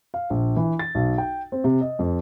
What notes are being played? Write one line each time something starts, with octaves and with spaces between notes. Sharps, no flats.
F5
A#1
E3
A6
B1
G5
C4
C3
D#5
F2